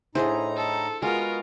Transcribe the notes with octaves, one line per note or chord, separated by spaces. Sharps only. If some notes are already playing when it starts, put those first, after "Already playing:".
A2 D3 D#4 E4 G#4 C5 A#5
A4
G#3 B3 F4 F#4 A#4